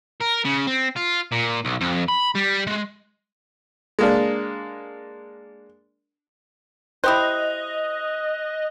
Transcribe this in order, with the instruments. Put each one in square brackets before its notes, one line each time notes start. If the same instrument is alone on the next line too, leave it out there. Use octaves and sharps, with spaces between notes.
[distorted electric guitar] A#4
C#3
C4
F4
A#2
B1
F2
B5
G3
G#3
[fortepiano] G#3 A#3 D4
[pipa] E4 G4 C5 [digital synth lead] D#5 [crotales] D#6 F#6